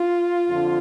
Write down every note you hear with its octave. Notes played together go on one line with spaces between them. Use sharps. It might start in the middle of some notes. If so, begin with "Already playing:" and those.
Already playing: F4
F2 D3 F3